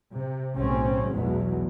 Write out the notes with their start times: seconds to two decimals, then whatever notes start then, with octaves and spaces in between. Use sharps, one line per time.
0.13 C3
0.57 B1 A2 C#3 C4 C#4
1.11 B1 E2 B2 E3 F#3 G#3